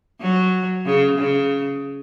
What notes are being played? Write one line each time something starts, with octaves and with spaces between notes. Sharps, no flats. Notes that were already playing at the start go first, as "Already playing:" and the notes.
F#3
C#3
C#3